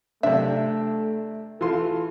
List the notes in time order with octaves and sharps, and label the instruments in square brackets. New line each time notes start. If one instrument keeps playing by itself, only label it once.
[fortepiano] C3 D4 [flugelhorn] A3 [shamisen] E5
[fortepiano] E3 F4 C6 [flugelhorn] A4